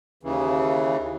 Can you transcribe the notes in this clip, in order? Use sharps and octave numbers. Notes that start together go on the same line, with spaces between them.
D#2 C#3 E3